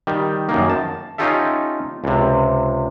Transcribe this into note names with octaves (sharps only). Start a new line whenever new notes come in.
D#3 G3
F#2 D#3 A#3
A5
C#4 D#4 F4 G4 A4 E5
C#2 C3